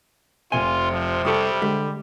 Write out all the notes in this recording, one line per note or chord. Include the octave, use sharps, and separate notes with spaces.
F1 C3 F4 G#5 G7
F3
C2 G3 G4 A4 A5 C#6 D#6
D3 G#3 G4